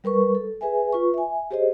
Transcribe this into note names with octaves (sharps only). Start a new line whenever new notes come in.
G3 A#4 B4 C#6
A4
G#4 B4 E5 G#5
F4 B4 C#6
E5 G#5
G4 G#4 C5 C#5 D#5